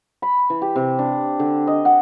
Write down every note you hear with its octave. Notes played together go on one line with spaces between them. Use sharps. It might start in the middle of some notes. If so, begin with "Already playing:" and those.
B5
E3
G4
C3
D4
D3
D#5
F#5